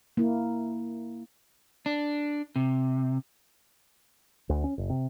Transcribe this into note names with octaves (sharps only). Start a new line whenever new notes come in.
A#3 E4
D4
C3
D2
C#4
F#1
C3